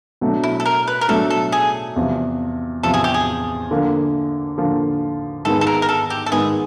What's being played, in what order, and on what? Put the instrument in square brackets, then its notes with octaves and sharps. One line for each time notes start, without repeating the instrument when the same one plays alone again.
[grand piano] B2 F#3 A3 D4
[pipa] E4
A4
A#4
B4
A#4
[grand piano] B2 F#3 A3 D4 [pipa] A4
[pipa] A4
G#4
[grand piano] E2 C3 F3
[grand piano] E2 C3 F3 [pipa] A4
[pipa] G#4
G4
G#4
[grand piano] D3 F3 A#3
D3 F3 A#3
[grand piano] G#2 D#3 G#3 B3 [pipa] A4
[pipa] A4
A#4
A#4
A4
G4
A4
[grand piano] G#2 D#3 G#3 B3 [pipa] G#4